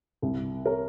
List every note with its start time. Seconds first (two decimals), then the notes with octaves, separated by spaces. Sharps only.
0.22 C2
0.65 A#4 C#5